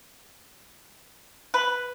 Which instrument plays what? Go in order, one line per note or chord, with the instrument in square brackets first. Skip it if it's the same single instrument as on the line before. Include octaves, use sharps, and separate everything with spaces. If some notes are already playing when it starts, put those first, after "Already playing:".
[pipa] B4